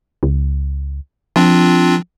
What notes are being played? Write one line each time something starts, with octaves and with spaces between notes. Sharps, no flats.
C#2
F3 C4 D4 F4